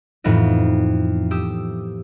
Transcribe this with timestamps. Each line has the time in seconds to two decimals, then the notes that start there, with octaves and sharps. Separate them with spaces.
0.24 F2 A2 E3 B3 D#4 D#5
1.31 G4 D#6 E6